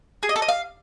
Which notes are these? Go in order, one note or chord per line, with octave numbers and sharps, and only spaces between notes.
G#4
D#5
A4
D#5
F5